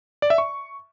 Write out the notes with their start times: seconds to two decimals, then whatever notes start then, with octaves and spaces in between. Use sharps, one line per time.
0.22 D5
0.30 E5
0.38 C#6